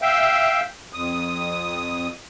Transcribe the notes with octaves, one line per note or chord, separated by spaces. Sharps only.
E5 F5 G5
F2 D#6